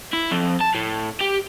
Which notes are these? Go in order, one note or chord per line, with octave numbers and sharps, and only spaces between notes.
E4
F2
A5
A2
G4